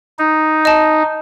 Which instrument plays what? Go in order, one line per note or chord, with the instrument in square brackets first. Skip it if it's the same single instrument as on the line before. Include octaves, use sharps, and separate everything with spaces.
[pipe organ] D#4
[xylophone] D#5 A5